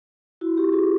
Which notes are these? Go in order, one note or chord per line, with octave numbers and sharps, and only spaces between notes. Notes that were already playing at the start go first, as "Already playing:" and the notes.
E4 F#4
F4 G4
F#4 G#4